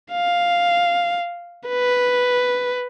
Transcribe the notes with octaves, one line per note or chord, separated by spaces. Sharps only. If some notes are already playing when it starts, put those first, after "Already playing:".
F5
B4